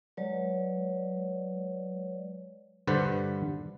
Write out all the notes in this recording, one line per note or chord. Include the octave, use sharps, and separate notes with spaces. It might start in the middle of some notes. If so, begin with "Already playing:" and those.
F#3 G#3 B4 C#5 D5
G2 D3 B4 C5 D5